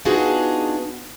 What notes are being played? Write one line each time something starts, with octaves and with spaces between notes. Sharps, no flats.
B3 D4 D#4 F4 F#4 G#4